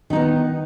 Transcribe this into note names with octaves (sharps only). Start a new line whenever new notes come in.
D#3 B3 D#4